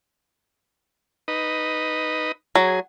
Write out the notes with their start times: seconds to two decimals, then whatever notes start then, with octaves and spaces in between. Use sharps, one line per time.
1.28 D#4 B4 D#5
2.55 F#3 G#4